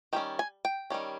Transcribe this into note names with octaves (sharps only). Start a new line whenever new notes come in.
D#3 G3 C#4 G5
G#5
G5
D#3 G3 C#4